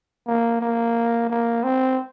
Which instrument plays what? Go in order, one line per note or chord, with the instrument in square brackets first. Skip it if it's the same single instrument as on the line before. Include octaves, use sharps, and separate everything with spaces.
[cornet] A#3
A#3
A#3
C4